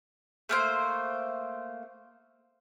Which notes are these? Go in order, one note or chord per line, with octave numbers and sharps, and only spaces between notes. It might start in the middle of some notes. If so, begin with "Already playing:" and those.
A3 A#3 C5